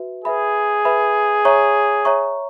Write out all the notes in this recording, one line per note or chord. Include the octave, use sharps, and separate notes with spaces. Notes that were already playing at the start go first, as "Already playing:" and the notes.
Already playing: F#4 B4 E5
G#4 B4 E5 B5
B4 E5 B5
C#5 E5 A#5 C#6
C#5 E5 A#5 C#6